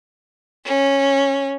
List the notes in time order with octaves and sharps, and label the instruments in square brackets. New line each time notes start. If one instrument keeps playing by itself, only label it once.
[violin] C#4